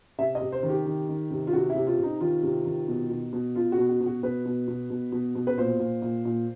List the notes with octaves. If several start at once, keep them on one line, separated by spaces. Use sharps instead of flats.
C3 E5
D#5
C3
C5
D#3
G4
D#3
D#3
C3
F4
C3 F#4
E4
C3
F4
C3
D#4
D#3 F4
C3
D#3
B2
B2
B2
B2 F4
F#4
B2
F#4
B2
F#4
B2 B4
B2
B2
B2
B2
B2
B4
A#2 C5
A#2
A#2
A#2